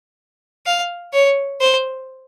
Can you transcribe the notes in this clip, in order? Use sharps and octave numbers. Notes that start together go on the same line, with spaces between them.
F5
C#5
C5